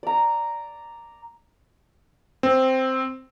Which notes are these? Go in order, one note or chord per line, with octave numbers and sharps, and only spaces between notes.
D5 A#5
C4